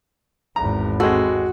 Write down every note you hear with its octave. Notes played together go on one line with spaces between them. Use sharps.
G#1 E2 A#5
G#3 C4 F#4 A4